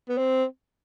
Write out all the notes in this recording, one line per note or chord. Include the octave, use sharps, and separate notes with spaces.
B3
C4